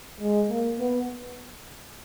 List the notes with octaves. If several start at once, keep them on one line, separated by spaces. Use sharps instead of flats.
G#3
A#3
B3